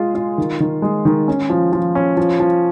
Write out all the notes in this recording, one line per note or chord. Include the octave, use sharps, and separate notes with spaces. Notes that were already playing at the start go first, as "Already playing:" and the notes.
Already playing: G#3 F4 G#4
F4
D#3
D#3
G#3
D#3
C#4
F3
F3
C#4
F3
F3